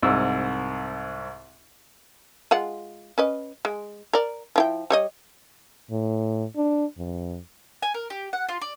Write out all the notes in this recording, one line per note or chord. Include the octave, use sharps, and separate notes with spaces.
C2 G#2 E6
G#3 F4 F#5
C#4 B4 D#5
G#3
A#4 D5
F3 E4 G5
G3 C#5 D#5
A2
D4
F2
G#5
A#4
G4
F#5
F4
D5